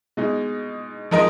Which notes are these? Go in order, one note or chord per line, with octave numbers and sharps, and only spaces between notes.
B2 G#3 D#4
F3 G#3 D#4 A#4 D#5